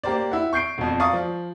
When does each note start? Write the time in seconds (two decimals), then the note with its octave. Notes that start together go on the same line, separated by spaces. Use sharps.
0.04 A#3 G4 A#4 C5 D5
0.31 E4 F#5
0.53 C#6 G6 C7 D7
0.78 E1 F2
1.00 D5 F5 A#5 C#6 D#6
1.13 F3